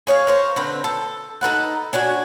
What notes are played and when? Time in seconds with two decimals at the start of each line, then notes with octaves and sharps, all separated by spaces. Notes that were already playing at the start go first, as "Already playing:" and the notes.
0.07 G#4 C#5 D#5 F5
0.27 A#4 C5 C#5
0.56 D3 C4 B4
0.84 A4
1.41 D#4 A4 B4 F#5
1.93 C#4 D4 F#4 G#5